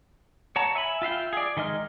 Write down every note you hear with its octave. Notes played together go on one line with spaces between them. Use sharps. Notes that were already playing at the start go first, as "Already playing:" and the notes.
C#5 F#5 A5 A#5
E5 G#5 B5
F4 E5 F5 G5
G#4 D5
D#3 G#3 D#5 F6